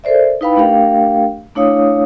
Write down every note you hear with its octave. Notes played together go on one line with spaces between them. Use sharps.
A4 A#4 C5 D5 E5
D#4 E4 B4 F5 G5 B5
A3 D4 G4 A#4 F5 G5
A3 D4 E4 C#5 F5 D#6